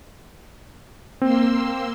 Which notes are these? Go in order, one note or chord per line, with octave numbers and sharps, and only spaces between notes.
A#3 C4 C6 E6